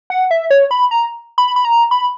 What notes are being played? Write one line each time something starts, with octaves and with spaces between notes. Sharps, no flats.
F#5
E5
C#5
B5
A#5
B5
B5
A#5
B5